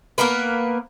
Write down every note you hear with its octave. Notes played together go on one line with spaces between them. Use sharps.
A#3 B3 A#4 B4